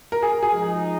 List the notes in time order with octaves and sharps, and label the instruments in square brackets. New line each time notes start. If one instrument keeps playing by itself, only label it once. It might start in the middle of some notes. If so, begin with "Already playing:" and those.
[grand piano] A#4
G#4
G#4
[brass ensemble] F3 G#3 D#4